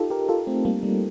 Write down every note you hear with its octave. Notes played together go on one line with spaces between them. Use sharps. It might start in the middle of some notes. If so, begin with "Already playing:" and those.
Already playing: D#4 F4 G4 A4
G4 A#4
F4 A4
A3 C4
G3 A#3
G3